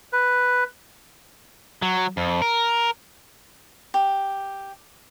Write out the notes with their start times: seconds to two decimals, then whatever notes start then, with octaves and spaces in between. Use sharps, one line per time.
0.13 B4
1.82 F#3
2.17 F2
2.42 A#4
3.94 G4